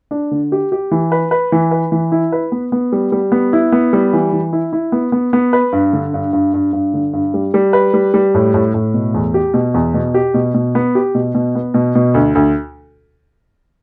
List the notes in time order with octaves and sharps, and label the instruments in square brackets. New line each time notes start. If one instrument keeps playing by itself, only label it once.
[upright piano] D4
D3
G4
G4
E3
B4
B4
E3
B4
E3
E4
B4
B3
B3
G3
G3
B3
E4
B3
G3
E3
E3
E4
E4
B3
B3
B3
B4
G2
D3
G2
G2
G2
G2
D3
G2
G3
G3
B4
G3
G3
A2
A2
A2
B2
E2
G4
B2
E2
B2
G4
B2
B2
B3
G4
B2
B2
B3
B2
B2
D2
D2